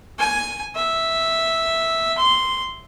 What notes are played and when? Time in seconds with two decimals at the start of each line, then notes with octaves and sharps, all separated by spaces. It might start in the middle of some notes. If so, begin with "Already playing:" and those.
0.19 G#5
0.75 E5
2.18 C6